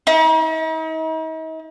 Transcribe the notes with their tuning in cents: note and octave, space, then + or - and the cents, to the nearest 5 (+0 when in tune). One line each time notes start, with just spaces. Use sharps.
D#4 +45